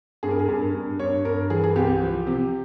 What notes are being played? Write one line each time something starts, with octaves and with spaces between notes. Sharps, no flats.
G2 G#4
A#4
G#4
G2
A#4
G2
G2 C#5
G2 A#4
E3 G#4
G#4
C2 G4
F3
C3